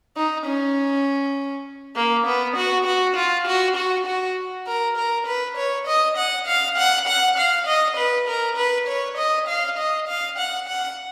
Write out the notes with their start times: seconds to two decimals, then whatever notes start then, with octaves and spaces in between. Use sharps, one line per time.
0.16 D#4
0.46 C#4
1.96 A#3
2.26 B3
2.56 F#4
2.86 F#4
3.16 F4
3.47 F#4
3.76 F#4
4.06 F#4
4.67 A#4
4.97 A#4
5.27 B4
5.57 C#5
5.87 D#5
6.17 F#5
6.47 F5
6.77 F#5
7.07 F#5
7.38 F5
7.67 D#5
7.97 B4
8.28 A#4
8.57 B4
8.87 C#5
9.17 D#5
9.48 F5
9.78 D#5
10.08 F5
10.38 F#5
10.67 F#5